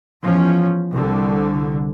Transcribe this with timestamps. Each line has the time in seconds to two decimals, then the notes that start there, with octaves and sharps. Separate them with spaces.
0.21 E2 F3 C#4
0.90 C2 D3